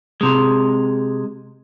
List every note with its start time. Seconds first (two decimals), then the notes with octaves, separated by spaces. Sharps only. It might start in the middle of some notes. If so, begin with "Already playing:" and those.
0.21 C3 G#3